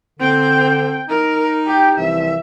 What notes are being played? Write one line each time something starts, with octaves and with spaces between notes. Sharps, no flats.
D3 C4 G5
D#4 A#4
G4 G5
C2 E3 F3 E5